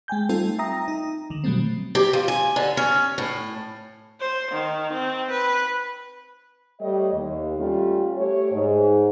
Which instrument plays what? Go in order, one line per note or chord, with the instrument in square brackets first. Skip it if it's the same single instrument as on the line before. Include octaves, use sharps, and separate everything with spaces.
[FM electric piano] G#3 G5 G#5 G6
G3 A3 C4 D#4 F4 A4
E5 G5 A#5 D#6 A#6
D#4
D3 D#3
B2 D#3 F#3 G3 A3 C4
[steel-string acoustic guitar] G4
F3
G#5
D3
C#4
A2
[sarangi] C5
D#3
C4
B4
[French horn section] G3 A3 C#5 D#5
D#2
G3 A3 C#4 F4
A3 G4 C#5
G#2